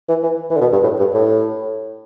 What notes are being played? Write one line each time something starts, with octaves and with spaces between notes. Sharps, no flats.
E3
E3
E3
D3
B2
G2
A2
G2
A2